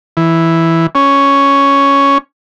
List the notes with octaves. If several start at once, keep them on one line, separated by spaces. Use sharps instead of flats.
E3
C#4